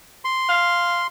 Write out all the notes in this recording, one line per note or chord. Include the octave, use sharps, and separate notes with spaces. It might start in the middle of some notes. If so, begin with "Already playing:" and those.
C6
F5